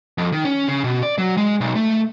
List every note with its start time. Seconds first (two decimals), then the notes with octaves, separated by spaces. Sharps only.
0.18 F2
0.32 D#3
0.45 C#4
0.68 C#3
0.84 B2
1.03 D5
1.18 F#3
1.37 G#3
1.61 B1
1.75 A3